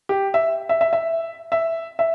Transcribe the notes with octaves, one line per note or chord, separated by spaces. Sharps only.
G4
E5
E5
E5
E5
E5
E5